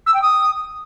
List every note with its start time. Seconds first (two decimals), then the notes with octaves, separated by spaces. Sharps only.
0.06 E6
0.14 G5
0.22 D#6